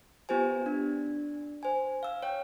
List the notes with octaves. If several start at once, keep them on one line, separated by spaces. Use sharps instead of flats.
B3 F4 G4 C5 G#5
D4
C5 G#5
F5 E6
C#5 G5